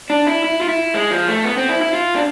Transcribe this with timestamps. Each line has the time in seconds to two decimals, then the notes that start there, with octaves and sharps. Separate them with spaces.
0.10 D4
0.27 E4
0.44 E4
0.61 F4
0.69 E4
0.94 G#3
1.11 F3
1.28 A3
1.44 B3
1.57 C4
1.69 E4
1.81 E4
1.95 F4
2.15 D4